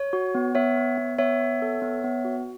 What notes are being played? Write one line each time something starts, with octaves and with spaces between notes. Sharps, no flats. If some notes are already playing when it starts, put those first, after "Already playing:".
Already playing: C#5
F#4
B3
B3 C#5 E5
B3
B3
B3 C#5 E5
B3
A4
B3
B3
F#4